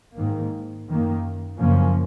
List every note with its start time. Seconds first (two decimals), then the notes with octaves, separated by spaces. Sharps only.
0.16 G#2 D#3 A#3
0.88 F#2 D#3 A#3
1.59 F#2 C#3 F3 A#3 C#4